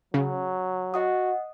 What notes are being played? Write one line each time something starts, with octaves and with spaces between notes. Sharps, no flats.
C#3 F#3
F#4 D#5 F#5 D#6